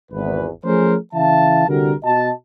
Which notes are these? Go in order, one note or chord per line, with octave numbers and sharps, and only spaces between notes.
G#1 E2 B4
F3 A3 C#4 G#4 A#4 C5
C#3 E3 E5 F5 A5
C2 D3 F#4 G4 A#4
B2 F#4 D#5 A5